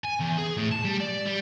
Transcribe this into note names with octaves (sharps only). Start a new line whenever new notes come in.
G#5
E2
G#4
A2
A5
G3
D5
G3